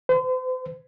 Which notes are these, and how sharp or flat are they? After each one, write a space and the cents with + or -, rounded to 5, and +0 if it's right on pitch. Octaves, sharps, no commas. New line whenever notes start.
C5 -40